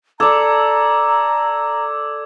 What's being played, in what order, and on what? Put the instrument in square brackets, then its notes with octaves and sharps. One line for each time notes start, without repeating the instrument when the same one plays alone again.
[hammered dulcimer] A4 D5 [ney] A#5 [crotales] D6 E6 G#6